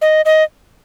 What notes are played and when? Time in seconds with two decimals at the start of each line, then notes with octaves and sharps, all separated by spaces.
0.02 D#5
0.25 D#5